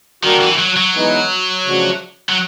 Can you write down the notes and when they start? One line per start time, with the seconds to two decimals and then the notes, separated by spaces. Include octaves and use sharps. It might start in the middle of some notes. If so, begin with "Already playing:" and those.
0.23 D#3 G3 A#3 D4 F#4
0.42 E3
0.59 F#3
0.77 F#3
0.95 E3 G#3 B3 D#4
1.66 C#3 F3 A3 D4 F#4
2.29 F#3